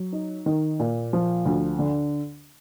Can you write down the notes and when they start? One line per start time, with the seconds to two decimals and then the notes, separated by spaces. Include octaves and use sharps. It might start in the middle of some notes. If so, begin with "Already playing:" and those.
Already playing: F#3
0.12 D#4
0.46 D#3
0.79 A#2
1.13 F3
1.46 D2
1.79 D3